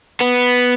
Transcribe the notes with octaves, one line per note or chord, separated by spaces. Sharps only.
B3